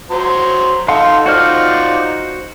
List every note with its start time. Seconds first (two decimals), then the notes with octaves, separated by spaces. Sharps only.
0.11 F#3 C5 A#5
0.88 D#4 A4 F5 F#5 C6
1.26 D#4 F4 F#4 C5 D5 F6